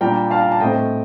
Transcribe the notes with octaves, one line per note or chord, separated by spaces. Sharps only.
A#2 G3 D4 G5 A#5
F5 A5
A#5
A5
A2 A3 C4 D#5 G5